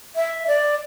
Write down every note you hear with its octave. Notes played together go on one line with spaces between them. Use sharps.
E5
D5